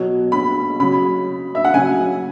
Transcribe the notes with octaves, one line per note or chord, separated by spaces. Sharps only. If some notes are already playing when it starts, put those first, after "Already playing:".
Already playing: B2 F#3
B5
C#3 F#3 B5
E5
F#5
C#3 F#3 G#5